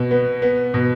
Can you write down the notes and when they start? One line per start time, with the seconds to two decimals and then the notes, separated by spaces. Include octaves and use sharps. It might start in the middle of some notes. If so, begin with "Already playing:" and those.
Already playing: B2
0.11 B3
0.42 B3
0.74 B2